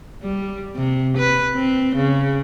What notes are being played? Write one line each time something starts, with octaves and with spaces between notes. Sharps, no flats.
G3
C3
B4
C4
C#3